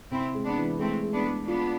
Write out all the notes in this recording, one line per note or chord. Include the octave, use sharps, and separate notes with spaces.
C3 C4 E4
G#3
B3 D4
E3
G#3 A3 C4
G#3
B3 D4
G#3
B3 D4 F4